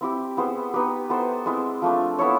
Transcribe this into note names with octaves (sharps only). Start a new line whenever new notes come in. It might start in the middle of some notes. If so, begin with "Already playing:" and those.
C4 E4 G4
B3 E4 G#4 C5
B3 D#4 G4 B4
B3 E4 A4 C5
G#3 C4 E4
F3 A3 D4
B3 E4 A4 C#5